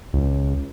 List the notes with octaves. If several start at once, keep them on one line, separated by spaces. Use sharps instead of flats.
C#2